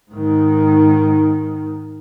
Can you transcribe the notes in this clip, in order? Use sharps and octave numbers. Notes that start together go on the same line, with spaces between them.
G#2 D#3